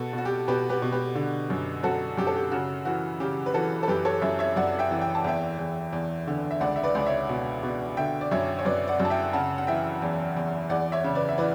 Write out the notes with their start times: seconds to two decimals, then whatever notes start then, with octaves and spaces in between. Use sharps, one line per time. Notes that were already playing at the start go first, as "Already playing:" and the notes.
Already playing: B2 F#4 A4
0.13 B2 F#4
0.25 G4
0.48 B2 G4 B4
0.69 G4 B4
0.82 B2
0.92 G4 B4
1.15 D3
1.50 F#2
1.83 F#2 F#4 A4
2.17 F#2 G4
2.27 A4
2.36 G4
2.51 C#3 F#4
2.85 E3 F#4
3.20 C#3 G4
3.46 B4
3.54 E3 F#4 A4
3.83 A4
3.88 F#2 G4 B4
4.05 A4 C#5
4.22 F#2 C#5 E5
4.39 C#5 E5
4.56 F#2 D5 F#5
4.79 E5 G5
4.91 E3
5.02 G5
5.15 A5
5.24 E2 E5 G5
5.59 E2
5.93 E2
6.27 D3
6.51 E5
6.60 C#2 D5 F#5
6.76 E5
6.84 B4 D5
6.95 C#2
7.00 D5
7.06 C#5 E5
7.29 B2
7.63 B2
7.97 D3 E5 G5
8.21 D5
8.31 F#2 C#5 E5
8.59 C#5
8.65 F#2 B4 D5
8.88 D5 F#5
9.00 F#2
9.05 A5
9.10 E5 G5
9.33 C#3 F#5 A5
9.58 F#5
9.67 E3 E5 G5
10.02 E2
10.37 E2
10.69 E2 D5 F#5
10.92 C#5 E5
11.04 C#3
11.15 B4 D5
11.29 E5
11.38 E3 B4 D5